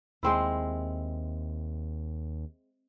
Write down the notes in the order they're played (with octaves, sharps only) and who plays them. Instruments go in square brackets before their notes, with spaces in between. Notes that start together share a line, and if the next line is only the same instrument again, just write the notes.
[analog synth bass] D#2 [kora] G#3 C4 E4